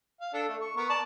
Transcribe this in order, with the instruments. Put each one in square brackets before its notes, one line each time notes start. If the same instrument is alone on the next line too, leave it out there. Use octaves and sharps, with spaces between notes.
[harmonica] F5
D4 A4
A3
C#6
B3 A#4 C#6
D5 A5